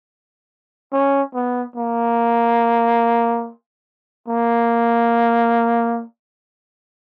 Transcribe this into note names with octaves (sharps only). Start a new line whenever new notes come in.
C#4
B3
A#3
A#3